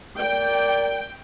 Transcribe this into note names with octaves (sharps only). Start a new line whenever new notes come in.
A#4 D5 G5